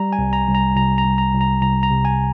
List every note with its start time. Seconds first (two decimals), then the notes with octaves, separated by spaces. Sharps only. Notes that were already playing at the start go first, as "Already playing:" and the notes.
Already playing: G3 A#5
0.13 G#5
0.19 C2
0.33 A#5
0.48 C2
0.55 A#5
0.76 C2 A#5
0.98 A#5
1.05 C2
1.18 A#5
1.33 C2
1.41 A#5
1.61 C2 A#5
1.83 A#5
1.90 C3
2.05 G#5